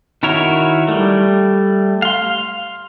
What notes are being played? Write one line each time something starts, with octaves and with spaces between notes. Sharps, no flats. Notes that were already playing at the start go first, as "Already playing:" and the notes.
D#3 E4 F#4 A#4 C#5
G3 A3
F5 C6